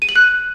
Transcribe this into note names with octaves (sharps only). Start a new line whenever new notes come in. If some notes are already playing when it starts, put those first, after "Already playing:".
D#7
F#7
F#6